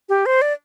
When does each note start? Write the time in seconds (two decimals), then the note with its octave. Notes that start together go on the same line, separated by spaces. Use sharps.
0.09 G4
0.26 C5
0.42 D5